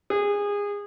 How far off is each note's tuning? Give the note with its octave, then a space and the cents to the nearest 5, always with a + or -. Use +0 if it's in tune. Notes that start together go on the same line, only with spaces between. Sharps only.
G#4 -25